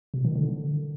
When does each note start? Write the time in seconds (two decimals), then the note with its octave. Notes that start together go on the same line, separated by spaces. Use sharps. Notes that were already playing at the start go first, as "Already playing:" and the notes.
0.14 B2
0.25 D#3
0.35 D3